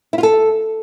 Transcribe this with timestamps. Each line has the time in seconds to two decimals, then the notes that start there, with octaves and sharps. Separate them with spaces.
0.13 E4
0.18 F4
0.23 A4